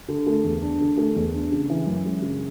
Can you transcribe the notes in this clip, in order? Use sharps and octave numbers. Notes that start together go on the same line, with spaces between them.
D3
A3
E2
D4
D3
A3
E2
D4
C#3
E3
F#2
G#3
C#3